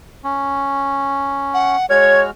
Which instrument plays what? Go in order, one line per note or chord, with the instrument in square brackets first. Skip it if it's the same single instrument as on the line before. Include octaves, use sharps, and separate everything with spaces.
[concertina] C#4
[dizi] F#5
[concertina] G#3 F#4 F6 [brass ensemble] C#5 [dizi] G#6